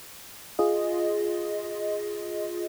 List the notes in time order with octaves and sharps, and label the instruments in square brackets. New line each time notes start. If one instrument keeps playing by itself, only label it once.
[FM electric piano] F4 G#4 D#5